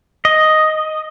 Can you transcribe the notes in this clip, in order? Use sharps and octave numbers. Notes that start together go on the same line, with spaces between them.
D#5